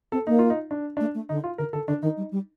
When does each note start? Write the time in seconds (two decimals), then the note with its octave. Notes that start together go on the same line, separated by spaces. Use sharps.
0.12 C4 A4
0.27 A#3 D#4
0.39 F4
0.50 D#4
0.71 D4
0.97 A3 D4
1.14 A3
1.29 D3 D#4
1.44 F4
1.58 D3 A#4
1.73 D3 A4
1.88 D3 D4
2.02 D#3 D#4
2.17 G3
2.31 G3